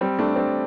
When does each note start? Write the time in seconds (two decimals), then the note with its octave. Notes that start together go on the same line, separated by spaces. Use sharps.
0.01 G3 C4
0.19 A3 D4
0.36 G3 C4